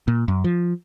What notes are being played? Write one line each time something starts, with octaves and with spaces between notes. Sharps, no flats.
A#2
F#2
F3